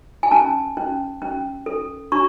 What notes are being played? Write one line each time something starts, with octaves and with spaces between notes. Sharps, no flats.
G#5
C#4 A5
C#4
C#4
A4
D4 C#6